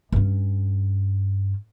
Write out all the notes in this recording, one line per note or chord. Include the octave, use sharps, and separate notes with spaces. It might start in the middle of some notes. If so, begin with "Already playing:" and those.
G2 C#4